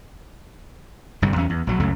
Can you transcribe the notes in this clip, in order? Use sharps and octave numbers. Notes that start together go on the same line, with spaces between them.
G1 G2 C3 G3
E2 C#4
E2
A#1 F#3
C#2 F#2 C#3 A3